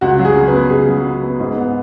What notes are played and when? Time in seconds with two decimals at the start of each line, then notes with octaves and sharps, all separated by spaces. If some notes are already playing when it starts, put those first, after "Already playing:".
0.01 C#2 F#4
0.19 F#3
0.25 G#4
0.35 C#3
0.48 B4
0.53 B3
0.70 C#2 G#4
0.88 F#3
1.05 C#3
1.23 B3
1.40 G#2
1.57 B3